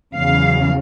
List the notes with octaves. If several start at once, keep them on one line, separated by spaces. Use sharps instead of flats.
E2 C#3 F#3 F5